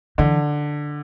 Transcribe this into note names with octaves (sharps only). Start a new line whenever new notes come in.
D3 E3